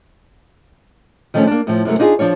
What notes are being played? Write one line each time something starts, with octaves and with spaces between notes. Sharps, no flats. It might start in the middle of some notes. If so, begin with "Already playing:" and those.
D#3 F3 A3 B3 C#4
A#3 D4
A2 F3
F#2 C3 F#3 A3
D4 D#4 F4 G4 G#4
F3 D4 F4 C#5